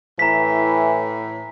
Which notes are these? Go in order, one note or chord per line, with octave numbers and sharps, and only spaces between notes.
A2 E3 A#5 B6